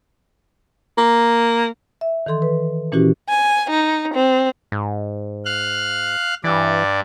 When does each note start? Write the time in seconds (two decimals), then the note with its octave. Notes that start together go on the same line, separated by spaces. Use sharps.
0.98 A#3
2.01 E5
2.26 D#3 E3 A4 C6
2.42 B4
2.92 A#2 E3 C#4 E4 F#4 G4
3.28 G#5
3.70 D#4
4.14 C4
4.72 G#2
5.45 F5 F6 F#6
6.44 G2 E3 D5